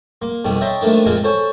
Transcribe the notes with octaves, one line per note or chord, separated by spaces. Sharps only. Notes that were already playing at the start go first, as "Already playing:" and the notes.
A#3 C6
F2 B2 D#3 G3
C#5 D#5 E5 G5 A5 C6
D#3 F3 A3 A#3 D4
F2 A#2 G#3 A#3 C4 F4
A4 C5 C#5 G#5